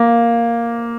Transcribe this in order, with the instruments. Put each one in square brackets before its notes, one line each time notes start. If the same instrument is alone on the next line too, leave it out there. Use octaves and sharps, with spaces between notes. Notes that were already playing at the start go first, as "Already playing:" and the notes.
Already playing: [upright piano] A#3